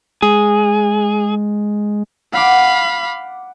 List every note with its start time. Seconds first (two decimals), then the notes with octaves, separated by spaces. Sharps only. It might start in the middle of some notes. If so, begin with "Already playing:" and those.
0.22 G#3 G#4
2.33 F5 F#5 B5 D6